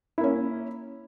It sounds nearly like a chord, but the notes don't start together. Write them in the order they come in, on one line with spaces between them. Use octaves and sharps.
E4 A#3 C#4